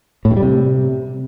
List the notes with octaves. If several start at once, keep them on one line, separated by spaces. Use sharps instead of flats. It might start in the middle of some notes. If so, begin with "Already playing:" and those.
A2
G2
G3
C3